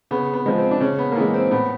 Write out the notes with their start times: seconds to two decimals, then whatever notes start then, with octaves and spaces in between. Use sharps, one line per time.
0.11 C#3 B3
0.34 B3
0.46 F3 G#3
0.58 C4
0.71 D4
0.80 C#3 C#4
0.98 B3
1.12 A#3
1.16 E3 G#3 B3
1.34 C4
1.51 A2 B3